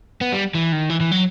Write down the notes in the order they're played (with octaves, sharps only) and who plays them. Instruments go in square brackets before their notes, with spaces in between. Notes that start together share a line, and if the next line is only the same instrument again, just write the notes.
[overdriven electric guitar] B3
G3
E3
D#3
E3
E3
F#3